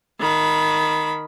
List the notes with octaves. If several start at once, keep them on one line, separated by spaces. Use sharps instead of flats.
D#3 B5